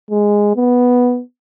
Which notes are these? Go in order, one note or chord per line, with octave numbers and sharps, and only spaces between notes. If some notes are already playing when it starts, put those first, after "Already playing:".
G#3
B3